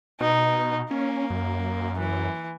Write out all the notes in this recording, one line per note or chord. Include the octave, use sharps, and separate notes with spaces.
B2 D#4
A#3 C#4
F#2
E3